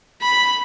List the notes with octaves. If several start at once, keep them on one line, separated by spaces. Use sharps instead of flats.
B5